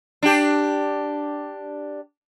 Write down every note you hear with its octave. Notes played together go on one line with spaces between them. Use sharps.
D4 G4